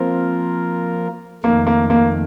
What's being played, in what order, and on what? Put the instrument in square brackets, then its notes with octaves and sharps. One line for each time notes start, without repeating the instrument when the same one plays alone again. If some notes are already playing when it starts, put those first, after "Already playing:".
Already playing: [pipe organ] F3 A#3 F4 A#4 [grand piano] C4
[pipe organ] F2 D#3 A3 [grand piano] A#3
[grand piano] A#3
A#3